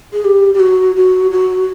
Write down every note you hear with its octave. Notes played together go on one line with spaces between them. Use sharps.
G#4
G4
G4
F#4
F#4
F#4